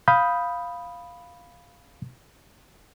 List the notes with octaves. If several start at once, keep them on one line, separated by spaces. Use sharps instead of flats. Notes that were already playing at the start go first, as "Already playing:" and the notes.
F5 B5 D#6 G6